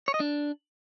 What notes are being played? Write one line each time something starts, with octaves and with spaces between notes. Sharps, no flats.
C#5
D#5
D4